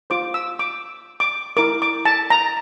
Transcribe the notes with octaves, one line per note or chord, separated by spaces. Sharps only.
F4 C5 D6
E6
D6
D6
E4 A#4 D6
D6
A5
A#5